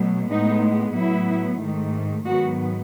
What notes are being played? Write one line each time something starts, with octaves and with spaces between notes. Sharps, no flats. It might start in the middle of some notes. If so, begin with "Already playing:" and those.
Already playing: B2 F#3 A3
A2 G#3 B3 D#4
A2 F#3 B3 E4
G#2 D#3 A3
G#2 D#3 F#3 B3 F#4